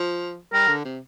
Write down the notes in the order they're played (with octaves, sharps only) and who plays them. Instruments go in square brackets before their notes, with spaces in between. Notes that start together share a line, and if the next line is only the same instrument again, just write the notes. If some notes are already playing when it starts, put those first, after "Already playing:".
Already playing: [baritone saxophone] F3
[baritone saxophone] G3 [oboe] A#4
[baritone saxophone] D3
C3